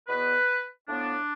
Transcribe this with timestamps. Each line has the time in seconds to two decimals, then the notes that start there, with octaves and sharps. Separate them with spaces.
0.07 E2 B2 B3 B4
0.87 A2 F3 B3 D4